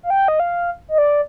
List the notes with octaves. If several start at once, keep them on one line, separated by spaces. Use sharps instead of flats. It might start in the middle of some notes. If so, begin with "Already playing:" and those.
F5
G5
D#5
F5
D#5
D5